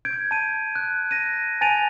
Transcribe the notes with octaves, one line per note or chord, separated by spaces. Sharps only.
G6 G#6 D7
A5 D#7
F#6
A#6 D#7
G#5 A5 A6 D7 D#7 F7